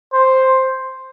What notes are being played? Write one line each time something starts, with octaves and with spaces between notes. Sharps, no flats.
C5